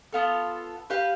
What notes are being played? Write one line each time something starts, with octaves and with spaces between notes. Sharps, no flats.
B3 F4 A4
G4 B4 F5